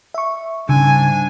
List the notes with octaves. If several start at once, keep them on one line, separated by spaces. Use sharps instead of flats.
E5 C#6
G#2 C#3 G3 D4 G#5